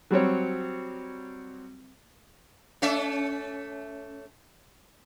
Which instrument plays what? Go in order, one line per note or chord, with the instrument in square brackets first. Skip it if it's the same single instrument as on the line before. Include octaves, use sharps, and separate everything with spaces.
[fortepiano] F#3 G3 C4 C#5
[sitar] A3 C#4 E5